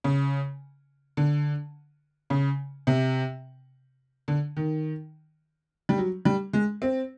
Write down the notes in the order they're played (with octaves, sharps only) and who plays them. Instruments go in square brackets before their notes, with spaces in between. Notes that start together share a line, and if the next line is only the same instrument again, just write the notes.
[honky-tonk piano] C#3
D3
C#3
C3
D3
D#3
G3
F#3
G3
G#3
C4